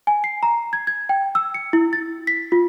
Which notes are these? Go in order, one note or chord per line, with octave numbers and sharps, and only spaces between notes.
G#5
C7
A#5
G#6
G#6
G5
E6
C#7
E4
A6
B6
F4